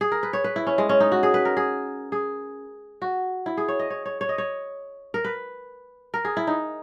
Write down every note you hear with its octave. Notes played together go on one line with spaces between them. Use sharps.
G#4
A#4
B4
C#5
B4
E4
C#4
G#3
C#4
D#4
F#4
G#4
B4
A#4
G#4
G#4
F#4
E4
G#4
C#5
D#5
C#5
C#5
C#5
D#5
C#5
A#4
B4
A#4
G#4
E4
D#4